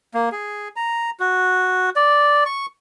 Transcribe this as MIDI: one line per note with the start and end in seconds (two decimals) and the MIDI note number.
0.14 0.29 58
0.32 0.68 68
0.76 1.10 82
1.20 1.90 66
1.96 2.44 74
2.46 2.66 85